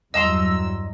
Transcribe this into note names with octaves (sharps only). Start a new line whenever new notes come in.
E2 G2 F#3 D#5 A#5 C6 E6